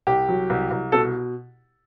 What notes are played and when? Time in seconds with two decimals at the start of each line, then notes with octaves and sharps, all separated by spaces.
0.07 C2 G4
0.29 F#3
0.50 C2
0.71 C2
0.92 B2 A4